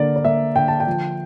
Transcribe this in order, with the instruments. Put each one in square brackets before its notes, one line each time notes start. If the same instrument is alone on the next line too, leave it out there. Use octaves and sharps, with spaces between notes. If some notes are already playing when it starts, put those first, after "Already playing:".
Already playing: [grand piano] D3 A#3 A#4 D5
D5
A#3 E5
D3 G5
A5
G5
F3